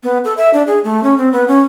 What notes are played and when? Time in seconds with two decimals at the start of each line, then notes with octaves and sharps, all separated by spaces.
0.03 B3
0.25 A4
0.37 E5
0.54 D4
0.67 G#4
0.84 A3
1.03 C#4
1.18 C4
1.33 B3
1.48 C#4